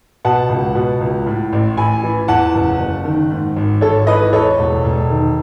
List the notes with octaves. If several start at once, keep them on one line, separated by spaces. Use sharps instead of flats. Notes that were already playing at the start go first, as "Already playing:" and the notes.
B2 F#5 A5
C#2
B2
C#2
A2
A1
A1 G#5 B5
E3
E2 F#5 A5
F#1
F#1
D#3
G#2
G#1
G#1 A4 C#5
E3 B4 D#5
E2 A4 C#5
E1
E1
D#3